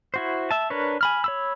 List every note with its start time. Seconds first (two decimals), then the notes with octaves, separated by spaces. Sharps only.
0.14 E4 F#4 C5
0.51 E5 A5
0.70 D4 A#4 B4 C#5
1.01 G#5 B5 F6
1.24 C#5 B5 E6